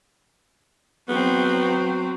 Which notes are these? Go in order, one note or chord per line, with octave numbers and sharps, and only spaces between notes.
F#3 B3 C4